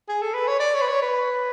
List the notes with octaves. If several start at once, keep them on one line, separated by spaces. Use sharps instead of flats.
G#4
A4
B4
C#5
D5
C#5
B4
C#5
B4